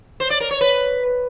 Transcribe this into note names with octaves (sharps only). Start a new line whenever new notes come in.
C5
D5
A#4
C#5
B4